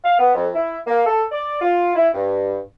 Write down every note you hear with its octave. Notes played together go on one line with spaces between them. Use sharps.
F5
B3
F2
E4
A#3
A4
D5
F4
E4
G2